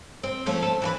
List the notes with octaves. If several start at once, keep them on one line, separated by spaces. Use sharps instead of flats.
C4
F3 A3 C#4
A4
E3 F#4 B4